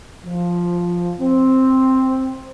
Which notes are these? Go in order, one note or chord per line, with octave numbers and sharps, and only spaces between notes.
F3
C4